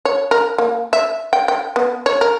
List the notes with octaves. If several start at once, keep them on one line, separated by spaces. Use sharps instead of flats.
C#5
A#4
A#3
E5
G5
G5
B3
C#5
A#4